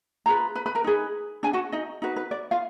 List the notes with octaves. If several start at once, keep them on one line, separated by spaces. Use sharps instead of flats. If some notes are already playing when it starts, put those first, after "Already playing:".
F4 G#4 B4 A#5
B4 B5
B4 B5
A#4 A#5
D#4 G#4 B4
D4 G#4 G#5
F#4 F#5
D#4 D#5
D#4 F#4 B4
B4
D5
F4 F5